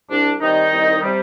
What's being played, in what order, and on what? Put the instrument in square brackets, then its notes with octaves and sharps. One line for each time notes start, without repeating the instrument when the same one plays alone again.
[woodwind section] C2 D4
C3 D#3 G3 D#4
C2
C3 G3